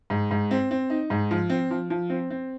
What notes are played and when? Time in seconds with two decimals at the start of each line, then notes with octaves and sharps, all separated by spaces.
0.10 G#2
0.31 G#2
0.51 C4
0.71 C4
0.90 D#4
1.10 G#2
1.31 F3
1.50 C4
1.71 F3
1.90 F3
2.10 C4
2.30 C4